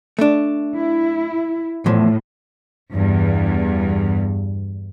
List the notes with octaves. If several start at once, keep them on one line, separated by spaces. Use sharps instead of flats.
A3 D4
E4
E2 A2 F3
E2 G2